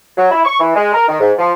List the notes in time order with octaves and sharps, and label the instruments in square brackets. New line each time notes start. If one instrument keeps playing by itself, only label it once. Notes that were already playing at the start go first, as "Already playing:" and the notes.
[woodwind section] F#3
E4
C#6
E3
G#3
A#4
D#3
G#2
F3